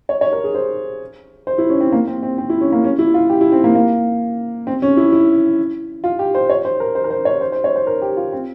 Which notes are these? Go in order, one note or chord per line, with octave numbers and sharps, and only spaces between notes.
C#5
C#5
A#4
G#4
C5
C5
E4
C#4
C4
A#3
C4
C4
C4
E4
C#4
A#3
C#4
E4
F4
G4
E4
C4
A#3
A#3
C4
C#4
E4
E4
F4
G4
C5
C#5
C5
A#4
C5
A#4
C5
C#5
C5
C5
C#5
C5
A#4
G4
F4
C4